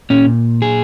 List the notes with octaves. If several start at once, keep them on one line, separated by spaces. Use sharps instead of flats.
A#2 C#4
G#4